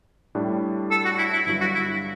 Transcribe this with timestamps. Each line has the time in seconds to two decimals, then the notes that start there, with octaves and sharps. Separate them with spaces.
0.35 A2 G3 D4
0.91 A4
1.05 F#4
1.18 E4
1.33 E4
1.46 G1 G2 F#3 E4
1.60 F#4
1.75 E4